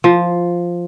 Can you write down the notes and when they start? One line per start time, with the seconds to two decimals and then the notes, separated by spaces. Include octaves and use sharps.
0.04 F3